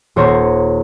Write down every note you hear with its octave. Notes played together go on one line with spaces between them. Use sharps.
D#1 C5 C#5 A#5